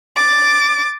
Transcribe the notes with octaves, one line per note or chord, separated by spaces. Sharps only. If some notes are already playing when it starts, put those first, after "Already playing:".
D6 A6